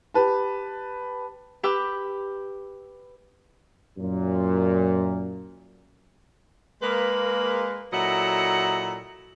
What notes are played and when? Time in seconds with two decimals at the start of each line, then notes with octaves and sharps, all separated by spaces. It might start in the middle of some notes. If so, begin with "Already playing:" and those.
0.14 G4 B4 A5
1.63 G4 B4 G5 D6 E6
3.97 F#2 A#2
6.82 G#3 A#3 B4
7.92 A#2 F#3 E4 A4 D#5 F#5